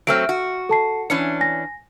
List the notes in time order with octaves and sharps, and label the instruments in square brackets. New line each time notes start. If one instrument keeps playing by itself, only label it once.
[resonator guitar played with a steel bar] F#3 A3 C4 [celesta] F6 D7
[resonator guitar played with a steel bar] F#4
[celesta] A4 A5 C7
[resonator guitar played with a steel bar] E3 C#4 D4 [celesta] C#7
[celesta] G#5 A#6